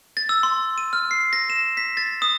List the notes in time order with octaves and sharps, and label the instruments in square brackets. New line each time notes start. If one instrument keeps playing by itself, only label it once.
[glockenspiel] A6
E6
C6
D#7
F6
C7
A#6
E7
B6
A6
D#6